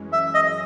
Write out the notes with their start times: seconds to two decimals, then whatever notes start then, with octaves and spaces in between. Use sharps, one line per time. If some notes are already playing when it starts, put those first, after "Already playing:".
Already playing: F#2 E3 G#3 C#4
0.12 E5
0.34 D#5